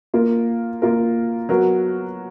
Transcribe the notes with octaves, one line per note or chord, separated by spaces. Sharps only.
A#3 F4 A#4
A#3 F4 A#4
F#3 B3 F#4 A#4